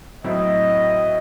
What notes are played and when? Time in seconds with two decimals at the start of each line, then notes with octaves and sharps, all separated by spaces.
0.24 A2 F#3 C4 E4 D#5